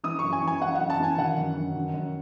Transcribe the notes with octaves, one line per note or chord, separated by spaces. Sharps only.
E3 D#6
F#2 C#6
G#5
E3
G#5
E3 F#5
F#2 F#5
A5
E3 G#5
D#3 F#5
F#2
F#2
D#3
F#2